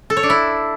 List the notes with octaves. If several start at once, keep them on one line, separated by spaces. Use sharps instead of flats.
A4
C#5
D4
E4